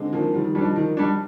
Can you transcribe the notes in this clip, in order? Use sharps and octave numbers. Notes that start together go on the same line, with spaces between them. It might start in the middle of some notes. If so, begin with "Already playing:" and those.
Already playing: D3 G#3 C4 D#4
D#3 F3 A#3
D#3 G3
D#3
F3 G3 D4
D#4
D#3
G3 D4